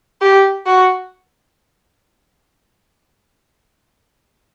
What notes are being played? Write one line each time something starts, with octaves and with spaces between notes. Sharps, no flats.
G4
F#4